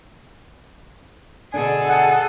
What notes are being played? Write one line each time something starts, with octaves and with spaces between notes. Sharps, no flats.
B2 D3 D4 G#4 A4 G#5
F#5